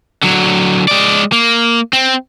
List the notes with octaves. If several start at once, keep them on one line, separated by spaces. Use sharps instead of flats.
D3 F#3
G#3 D5
A#3
C4